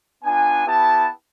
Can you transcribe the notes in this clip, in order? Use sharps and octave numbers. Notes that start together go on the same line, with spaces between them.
B3 D4 F4 G#5
B3 E4 G4 A5